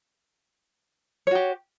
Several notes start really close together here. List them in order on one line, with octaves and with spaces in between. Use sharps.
C#5 F#4 G4